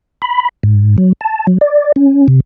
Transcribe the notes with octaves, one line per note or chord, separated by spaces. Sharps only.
B5
G#2
F#3
A5
F#3
D5
C#4
C3